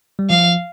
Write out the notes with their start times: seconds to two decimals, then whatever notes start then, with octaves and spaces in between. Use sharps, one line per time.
0.19 G3
0.30 F3 F5